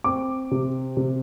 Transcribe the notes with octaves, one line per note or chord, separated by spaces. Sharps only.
C4 D6
C3
C3